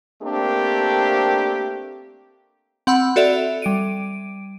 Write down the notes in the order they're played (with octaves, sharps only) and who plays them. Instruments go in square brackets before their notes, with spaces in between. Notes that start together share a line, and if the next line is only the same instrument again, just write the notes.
[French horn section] A3 A#3 C4 D4 G4 A#4
[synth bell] C4 F#5 B5 E6
F#4 A4 D5 E5 F7
G3 D7 D#7